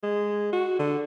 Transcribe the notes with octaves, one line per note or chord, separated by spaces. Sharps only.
G#3
F#4
D3